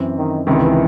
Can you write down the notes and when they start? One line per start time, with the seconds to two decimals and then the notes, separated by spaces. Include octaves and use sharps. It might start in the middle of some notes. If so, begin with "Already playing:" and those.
Already playing: F#2 E3 C4
0.16 D#3
0.47 C#2 C3 D#3 E3